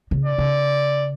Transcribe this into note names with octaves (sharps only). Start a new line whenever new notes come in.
C#3
D5
C#3